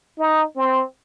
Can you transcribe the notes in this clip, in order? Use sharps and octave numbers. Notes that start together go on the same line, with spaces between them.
D#4
C4